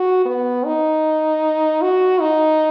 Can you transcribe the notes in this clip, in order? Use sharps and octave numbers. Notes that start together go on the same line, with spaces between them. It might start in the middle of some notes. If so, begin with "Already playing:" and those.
Already playing: F#4
B3
D#4
F#4
D#4